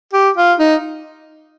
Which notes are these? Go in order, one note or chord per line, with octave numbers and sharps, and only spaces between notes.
G4
F4
D#4